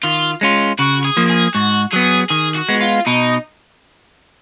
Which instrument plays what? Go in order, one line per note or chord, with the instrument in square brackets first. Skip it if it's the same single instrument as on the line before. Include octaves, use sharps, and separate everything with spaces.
[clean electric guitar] D#3 [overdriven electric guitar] F4
[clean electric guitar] G#3 C#4 F4
[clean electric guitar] C#3 [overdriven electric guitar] F#4
[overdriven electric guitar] G#4
[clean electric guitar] F3 A#3
[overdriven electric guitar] G#4
[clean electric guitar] G#2 [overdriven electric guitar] F#4
[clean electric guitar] F#3 B3 [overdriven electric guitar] G#4
[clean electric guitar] D#3 [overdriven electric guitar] G#4
[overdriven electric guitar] F#4
[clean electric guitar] G#3 B3
[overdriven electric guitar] F4
[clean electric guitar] B2 [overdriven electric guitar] D#4